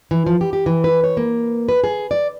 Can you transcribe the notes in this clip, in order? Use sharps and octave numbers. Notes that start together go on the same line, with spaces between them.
E3
F3
G4
G4
E3
B4
C#5
A#3
B4
G#4
D5